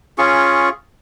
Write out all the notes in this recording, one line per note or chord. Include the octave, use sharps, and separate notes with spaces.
C#4 F4 G#4 C#6